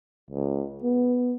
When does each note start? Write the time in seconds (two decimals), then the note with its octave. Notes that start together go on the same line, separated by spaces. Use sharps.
0.30 C#2
0.83 B3